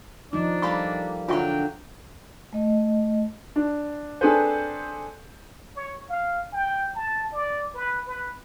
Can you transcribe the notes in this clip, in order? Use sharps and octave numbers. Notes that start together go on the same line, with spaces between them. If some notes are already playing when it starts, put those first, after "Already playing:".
F3 D4 D#4
G3 A#3 A4 B5 C#6
D3 F#3 F4 E5 G5 C#6
A3 D#5
D4
C4 D4 G#4 A4 B4 C5
C#5
F5
G5
A5
D5
B4
B4